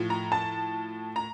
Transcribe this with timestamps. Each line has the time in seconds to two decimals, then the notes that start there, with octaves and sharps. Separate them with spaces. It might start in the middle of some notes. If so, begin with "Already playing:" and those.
Already playing: A2 F3
0.10 A#5
0.32 A5
1.16 A#5